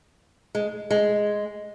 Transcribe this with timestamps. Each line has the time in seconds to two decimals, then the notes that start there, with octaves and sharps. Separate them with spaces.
0.55 G#3
0.91 G#3